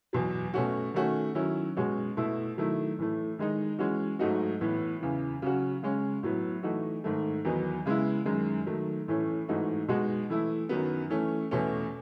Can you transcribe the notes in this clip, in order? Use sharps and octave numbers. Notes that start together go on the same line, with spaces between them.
E2 B2 F#3
B2 A3 C#4 F#4
D#3 A3 C#4 F#4
D#3 F#3 C#4 E4
B2 G#3 C#4 F#4
B2 A3 E4
D#3 F#3 A3 E4
A2 E3 A3
D#3 G#3 D#4
E3 G#3 C#4 F#4
G#2 F#3 A3 D#4 F#4
A2 E3 B3
E2 C#3 E3
C#3 F#3 C#4 F#4
C#3 G#3 C#4
A2 F#3 B3
E3 A3 D#4 F#4
G#2 D#3 A3
E2 D#3 F#3 B3 D#4
C#3 G#3 B3 E4
F#2 D#3 G#3
D#3 F#3 A3
A2 E3 A3 C#4
G#2 E3 A3 D#4 F#4
B2 G#3 D#4 F#4
E3 A3 E4
F#2 D#3 F#3 B3
E3 A3 C#4
E2 B2 A3 C#4